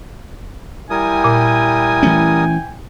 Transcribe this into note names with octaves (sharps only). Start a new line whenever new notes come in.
G3 E4 A#4 G5 G#5 D#6
A#2
E3 A3 C#4